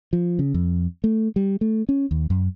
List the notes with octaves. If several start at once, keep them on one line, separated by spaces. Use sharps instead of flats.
F3
C#3
F2
A3
G3
A3
C#4
D#2
F#2